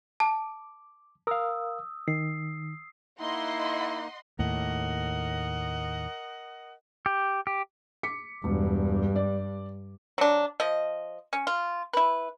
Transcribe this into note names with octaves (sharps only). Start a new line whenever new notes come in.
A5 D6
A#4 F5 D#6 E6
D#3 C7
A#3 D#4 E4 D#5 F#5 C6
D#2 A2 A#4 D#5 F#5
G4
G4
D6 B6 C#7
E1 G2
D5
F#3 D4
F3 D#5
C#4
F4
E4 B4